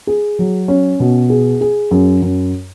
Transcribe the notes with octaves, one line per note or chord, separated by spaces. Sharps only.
G#4
F#3
C#4
B2
G#4
G#4
F#2
F#2